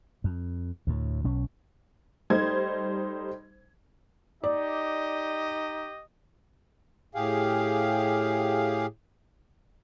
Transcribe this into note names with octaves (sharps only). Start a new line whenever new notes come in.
F2
D2 A2
B1 C#4
G3 A3 D#4 C5 G#6
D#4 G4 D5 D#5
A2 G4 G#4 F5